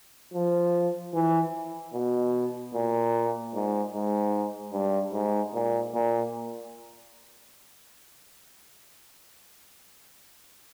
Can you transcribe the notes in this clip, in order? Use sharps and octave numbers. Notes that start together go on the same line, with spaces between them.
F3
E3
B2
A#2
G#2
G#2
G2
G#2
A#2
A#2